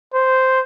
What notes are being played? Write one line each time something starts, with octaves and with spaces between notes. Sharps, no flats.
C5